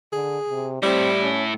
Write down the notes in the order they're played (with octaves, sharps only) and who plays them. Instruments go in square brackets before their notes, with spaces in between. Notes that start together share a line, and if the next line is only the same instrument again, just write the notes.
[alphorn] D3 [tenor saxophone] G#4
[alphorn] C3
[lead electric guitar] A2 E4 [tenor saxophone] G3 [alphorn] C4
[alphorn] C#4